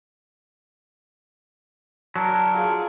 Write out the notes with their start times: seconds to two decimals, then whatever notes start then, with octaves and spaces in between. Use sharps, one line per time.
2.16 F#3 D4 A#4
2.54 F4 G#4